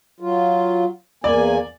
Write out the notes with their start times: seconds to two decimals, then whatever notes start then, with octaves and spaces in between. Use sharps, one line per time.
0.20 F#3 F4
1.24 E2 A#3 D5 G#5